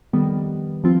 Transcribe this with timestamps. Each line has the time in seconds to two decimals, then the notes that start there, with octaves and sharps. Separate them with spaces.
0.13 F2 D#3 G3 B3
0.84 F3 C4 F4